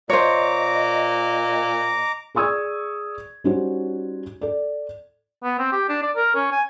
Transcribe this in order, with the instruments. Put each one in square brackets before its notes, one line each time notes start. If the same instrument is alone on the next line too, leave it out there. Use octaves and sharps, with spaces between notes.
[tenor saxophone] A#2 [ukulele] C5 C#5 [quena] D#5 [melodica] A#5 D6
[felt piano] G#4 D5 C#6 D#6 E6 G#6
G3 C#4 D#4 F#4 C5 C#5
A4 D5
[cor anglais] B3
C4
G4
D4
D5
A#4
C#4
G#5